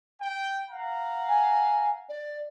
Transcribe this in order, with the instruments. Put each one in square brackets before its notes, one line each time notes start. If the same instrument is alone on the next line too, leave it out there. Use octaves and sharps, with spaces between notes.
[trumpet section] G5
F5 F#5 A#5
[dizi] G#5
D5